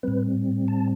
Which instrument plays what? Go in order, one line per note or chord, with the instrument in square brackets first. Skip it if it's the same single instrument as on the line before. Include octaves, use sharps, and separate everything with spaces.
[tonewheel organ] A2 G3 C4 B4
A5